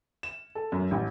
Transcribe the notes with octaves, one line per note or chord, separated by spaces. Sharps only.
E7
A4
F#2
A1